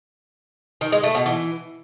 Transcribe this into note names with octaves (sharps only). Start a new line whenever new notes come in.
D#3
G#3
A3
B2
E3